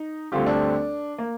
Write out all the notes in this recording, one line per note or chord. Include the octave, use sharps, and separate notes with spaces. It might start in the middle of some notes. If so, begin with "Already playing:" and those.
Already playing: D#4
D2 D3 G3 C4 F4 G4
D4
A#3